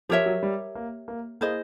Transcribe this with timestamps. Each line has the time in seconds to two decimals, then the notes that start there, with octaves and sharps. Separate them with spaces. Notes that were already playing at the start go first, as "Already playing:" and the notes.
0.09 F3 G4 A#4 C#5 E5
0.26 F#3
0.43 G3
0.75 A#3
1.08 A#3
1.41 A#3 E4 G#4 C5 D#5